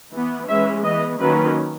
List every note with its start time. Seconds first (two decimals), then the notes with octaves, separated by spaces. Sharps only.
0.13 E3 B3
0.48 E3 G#3 C#4 E5
0.84 E3 B3 D#5
1.19 D#3 F#3 A#3 C#4 B4